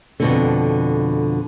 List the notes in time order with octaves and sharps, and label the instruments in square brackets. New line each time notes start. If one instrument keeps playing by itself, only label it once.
[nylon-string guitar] F2 B2 D3